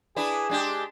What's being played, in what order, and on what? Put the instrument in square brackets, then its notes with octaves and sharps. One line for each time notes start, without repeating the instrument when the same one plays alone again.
[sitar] D4 E4 B4 [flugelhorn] G#4
[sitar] G#3 D4 G4